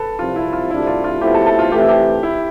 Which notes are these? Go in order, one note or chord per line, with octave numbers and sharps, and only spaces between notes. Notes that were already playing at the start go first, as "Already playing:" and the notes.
Already playing: A4 B4
C2 C3 F3 F4
E4
F4
D2 C3 G3 D4 E4
F4
F4
B2 A3 C4 E4 G4
A4
A4
F4
C3 E3 A3 G4
G4
E4